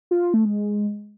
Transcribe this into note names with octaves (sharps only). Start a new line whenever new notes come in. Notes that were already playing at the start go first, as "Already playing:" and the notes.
F4
F4
A3
G#3